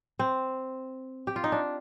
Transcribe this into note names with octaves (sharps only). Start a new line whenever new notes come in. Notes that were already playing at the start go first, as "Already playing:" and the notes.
C4
G4
F4
D#4
D4